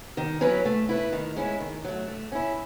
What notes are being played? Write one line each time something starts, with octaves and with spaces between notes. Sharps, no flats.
D#3
F#3 C#4 E4 B4
A3
E4 B4
D#3
G#3 C#4 E4
D#3
F#3 A3
A3
C#4 E4